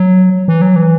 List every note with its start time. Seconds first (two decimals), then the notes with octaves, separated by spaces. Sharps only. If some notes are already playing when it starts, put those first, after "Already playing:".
Already playing: F#3
0.48 E3
0.62 F#3
0.76 E3